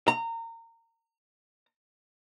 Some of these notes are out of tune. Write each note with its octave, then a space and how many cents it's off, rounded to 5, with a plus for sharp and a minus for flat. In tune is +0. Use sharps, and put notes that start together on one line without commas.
A#5 -25